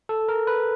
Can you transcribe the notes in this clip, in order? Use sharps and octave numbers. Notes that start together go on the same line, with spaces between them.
A4
A#4
B4